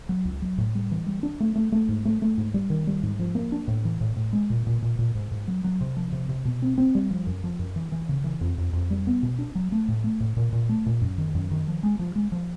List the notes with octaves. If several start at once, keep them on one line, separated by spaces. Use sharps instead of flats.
F#3
C#2
F#3
A2
G3
E3
G3
D4
A3
A3
A3
G#2
A3
A3
G#2
G3
D#3
G3
G#2
F3
A#3
D4
A2
E3
A2
A2
G#3
A#2
A#2
A#2
A#2
G#2
G#2
F#3
F#3
C3
F3
C3
C3
B2
C4
C4
G3
F3
F#2
F3
F#2
E3
E3
C#3
E3
F2
F2
F2
G3
B3
B2
D4
F#3
A3
A2
A3
A2
A#2
A#2
A3
A#2
F#2
D#3
F#2
D#3
F3
G#3
F3
G#3
F3